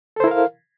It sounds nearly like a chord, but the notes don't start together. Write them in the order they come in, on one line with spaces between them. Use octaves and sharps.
A4 C5 E4 A#4 F5